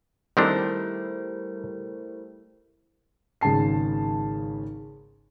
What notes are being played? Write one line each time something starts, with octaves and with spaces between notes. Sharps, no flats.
D#3 G3 A3 C4 D4 E4 A#4 C5
G#1 C#3 G#4 A5 C7